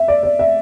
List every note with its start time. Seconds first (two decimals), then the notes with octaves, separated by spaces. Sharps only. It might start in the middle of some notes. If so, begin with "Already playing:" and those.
Already playing: E5
0.08 D5
0.23 D5
0.39 E5